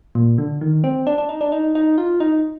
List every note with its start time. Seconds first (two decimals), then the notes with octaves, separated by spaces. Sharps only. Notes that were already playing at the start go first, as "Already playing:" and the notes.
0.15 A#2
0.38 D3
0.61 D#3
0.84 C4
1.07 D4
1.18 D4
1.29 D#4
1.41 D4
1.52 D#4
1.75 D#4
1.98 F4
2.20 D#4